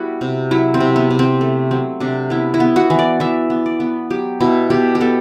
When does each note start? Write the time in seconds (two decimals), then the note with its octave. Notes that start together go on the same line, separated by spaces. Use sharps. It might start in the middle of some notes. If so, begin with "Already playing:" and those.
Already playing: G3 B3 E4 F#4
0.21 C3
0.51 F#3 E4
0.74 C4
0.80 C3
0.96 B3
1.11 C3
1.19 C4
1.41 A3
1.71 F#3 C4
2.00 C3 D4
2.30 B3 E4
2.54 E4
2.60 B3
2.76 F#4
2.90 E3
2.99 D5
3.20 E3 E5
3.50 B3
3.66 D5
3.80 B3
4.10 F#3 G4
4.40 B2 E4
4.70 B2 G4
4.95 G4
5.01 B3 A4